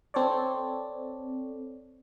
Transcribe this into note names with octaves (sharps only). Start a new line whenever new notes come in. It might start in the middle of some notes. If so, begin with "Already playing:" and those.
C4 A4 C#5 D5